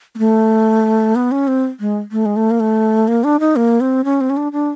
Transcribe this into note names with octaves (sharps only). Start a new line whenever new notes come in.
A#3
A3
B3
C#4
C4
G#3
A3
G#3
A3
A#3
A3
A#3
D4
D#4
A#3
C4
C#4
C4
C#4
D4
D4